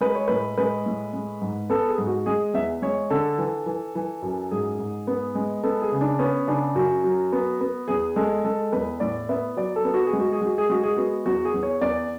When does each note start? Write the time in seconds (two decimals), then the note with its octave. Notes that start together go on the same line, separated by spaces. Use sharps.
0.01 G#3 B4
0.15 C#5
0.28 A2 B4
0.58 G#3 B4
0.86 A2
1.13 G#3
1.42 G#2
1.70 B3 A4
1.89 G#4
1.98 G#2
2.07 F#4
2.26 G#3 G#4
2.54 E2 E5
2.82 G#3 C#5
3.10 D3 A4
3.38 E3
3.66 E3
3.95 E3
4.22 F#2
4.51 G#2 G#4
4.79 G#2
5.07 B3
5.35 G#3
5.63 B3 A4
5.82 G#4
5.92 C#3
6.01 D4
6.19 B3 C#4
6.47 C#3 D4
6.75 F#2 F#4
7.04 F#3
7.33 B3
7.61 B3
7.88 E2 G#4
8.16 G#3 A4
8.45 G#3 A4
8.72 E2 B4
9.00 A2 D5
9.29 B3 E5
9.57 F#3 D5
9.76 A4
9.84 B3
9.94 F#4
10.07 G#4
10.13 G#3
10.20 F#4
10.32 G#4
10.41 G#3 F#4
10.58 G#4
10.70 G#3 F#4
10.83 G#4
10.97 B3 F#4
11.26 E2 F#4
11.45 G#4
11.54 E2
11.63 C#5
11.81 E2 D5